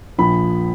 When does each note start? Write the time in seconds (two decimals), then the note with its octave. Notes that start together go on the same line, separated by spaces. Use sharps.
0.18 A#1 A#2 F3 B5